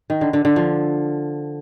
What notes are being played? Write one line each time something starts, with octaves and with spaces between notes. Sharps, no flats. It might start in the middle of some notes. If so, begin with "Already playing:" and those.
D#3
D3
D3
D3
F3